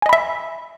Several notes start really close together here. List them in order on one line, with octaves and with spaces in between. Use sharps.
G#5 D#5 B5 E5